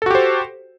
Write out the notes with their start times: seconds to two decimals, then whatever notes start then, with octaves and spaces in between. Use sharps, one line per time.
0.02 A4
0.06 F#4
0.10 G4
0.15 C5